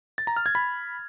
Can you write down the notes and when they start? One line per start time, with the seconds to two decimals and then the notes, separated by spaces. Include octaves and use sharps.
0.18 A6
0.27 A#5
0.37 F6
0.46 G#6
0.55 B5